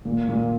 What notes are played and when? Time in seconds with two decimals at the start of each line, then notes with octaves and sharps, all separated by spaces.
0.05 A#2
0.29 A#2